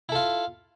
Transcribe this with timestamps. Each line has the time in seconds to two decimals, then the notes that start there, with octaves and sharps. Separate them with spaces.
0.09 E4
0.12 A4
0.15 F4